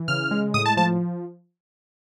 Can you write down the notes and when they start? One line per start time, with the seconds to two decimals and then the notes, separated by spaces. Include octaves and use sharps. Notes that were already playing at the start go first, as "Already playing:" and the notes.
Already playing: E3
0.08 C#3 F6
0.31 G#3
0.54 A2 D#6
0.66 A5
0.77 F3 A5